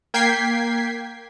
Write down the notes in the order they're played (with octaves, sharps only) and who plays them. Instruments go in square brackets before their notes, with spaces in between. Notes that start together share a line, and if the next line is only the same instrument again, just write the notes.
[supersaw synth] A#3 G5 G#6 B6 C7